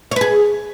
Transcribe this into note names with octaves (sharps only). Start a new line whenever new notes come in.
G#4 B4 C#5